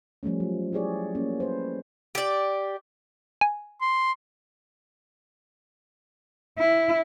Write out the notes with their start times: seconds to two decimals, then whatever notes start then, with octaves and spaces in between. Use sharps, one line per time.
0.23 F3 G3 A3 C#4
0.40 F#3
0.73 E4 G4 G#4 C#5 D5
1.15 A#3 C#4
1.40 B4 C5
2.15 G4 D5
3.41 G#5
3.81 C6
6.58 E4